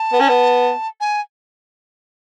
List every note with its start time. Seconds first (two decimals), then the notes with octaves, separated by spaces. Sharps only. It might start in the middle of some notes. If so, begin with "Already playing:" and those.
Already playing: A5
0.13 B3
0.20 C#4
0.29 B3
1.00 G#5